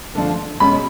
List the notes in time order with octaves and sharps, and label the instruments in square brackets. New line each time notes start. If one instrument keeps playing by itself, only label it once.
[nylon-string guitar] D3 F3 A3 D4 F4
[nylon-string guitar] B2 G#3 C#4 [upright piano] B5